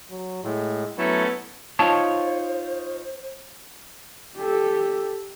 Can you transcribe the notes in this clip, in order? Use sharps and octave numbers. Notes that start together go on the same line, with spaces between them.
F#3
A2 G#3
F#3 A3 B3 C#4 E4 A4
D#4 F4 C5 C#5 A5
G4 A4